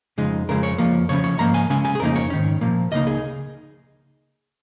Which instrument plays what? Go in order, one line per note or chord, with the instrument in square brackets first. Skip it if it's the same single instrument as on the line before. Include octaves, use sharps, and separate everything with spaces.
[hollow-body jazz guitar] F2 C#3 G#3 D#4
F2 C#3 G#3 A#4
C#5
F2 F3 A#3
C#3 F3 C#4 C#5
C#5
G#2 F3 A#3 A#5
G#5
C#3 G#3 C#4 G#5
G#5
G#4
F2 C#3 A#3 D#4 A#4
C#5
G#2 D#3 C#4
A#2 F3 A#3
C#2 C#3 A#3 D#4 D#5
G#4